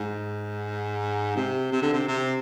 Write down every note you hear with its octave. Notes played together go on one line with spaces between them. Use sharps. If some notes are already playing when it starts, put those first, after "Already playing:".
Already playing: G#2
C3
C3
D3
C3
C3